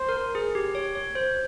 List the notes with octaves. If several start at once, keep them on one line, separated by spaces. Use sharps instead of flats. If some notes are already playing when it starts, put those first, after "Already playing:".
Already playing: C5
A#4
G#4
G4
C#5
C#5
C5